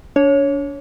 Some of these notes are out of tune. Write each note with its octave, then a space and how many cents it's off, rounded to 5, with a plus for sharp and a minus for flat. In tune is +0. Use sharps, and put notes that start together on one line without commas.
D4 -35 C#5 +0